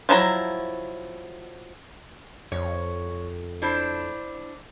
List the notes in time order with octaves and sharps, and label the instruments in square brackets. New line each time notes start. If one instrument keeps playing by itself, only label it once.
[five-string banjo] F3 F#3 E4 A#5
[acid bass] F2 [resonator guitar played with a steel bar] C#5
[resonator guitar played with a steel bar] D4 E4 C5